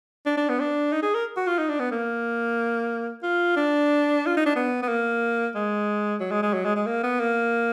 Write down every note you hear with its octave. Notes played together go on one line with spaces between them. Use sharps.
D4
D4
B3
D4
D#4
G#4
A#4
F#4
F4
D#4
D4
B3
A#3
F4
D4
F4
D#4
D4
B3
B3
A#3
G#3
F#3
G#3
G#3
F#3
G#3
G#3
A#3
B3
A#3